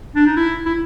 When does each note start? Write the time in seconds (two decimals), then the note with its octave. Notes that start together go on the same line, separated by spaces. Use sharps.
0.15 D4
0.26 D#4
0.36 E4
0.66 E4